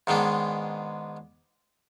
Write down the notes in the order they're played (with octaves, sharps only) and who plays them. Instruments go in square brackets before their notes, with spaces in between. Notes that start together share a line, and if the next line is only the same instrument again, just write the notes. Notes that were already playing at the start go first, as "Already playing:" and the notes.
[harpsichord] G#2 D#3 G#3 B3 D4